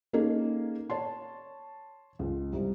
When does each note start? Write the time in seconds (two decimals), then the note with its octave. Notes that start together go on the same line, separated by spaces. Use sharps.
0.13 A#3 C#4 D#4 G#4 A4
0.90 C#5 A5 C6
2.19 C#2
2.53 C2